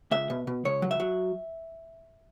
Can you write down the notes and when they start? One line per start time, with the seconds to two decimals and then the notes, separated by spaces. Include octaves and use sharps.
0.11 C#2 E5
0.30 B2
0.47 B2
0.65 C#2 C#5
0.82 F#3
0.91 E5
1.00 F#3